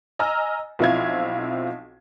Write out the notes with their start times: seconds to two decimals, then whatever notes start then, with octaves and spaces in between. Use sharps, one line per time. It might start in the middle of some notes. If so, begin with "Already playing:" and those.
0.19 D#5 G#5 A#5 E6 F6
0.79 B1 F3 C4 E4 F5 G#6